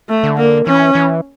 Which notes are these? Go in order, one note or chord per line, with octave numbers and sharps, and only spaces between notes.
A3
D3
A#3
E3 C#4
E3